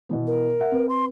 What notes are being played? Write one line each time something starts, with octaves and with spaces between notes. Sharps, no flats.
B2 E3 B3
A#4
E5 F#5
C4 B4
C6